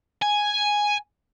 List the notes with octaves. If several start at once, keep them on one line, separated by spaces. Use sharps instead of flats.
G#5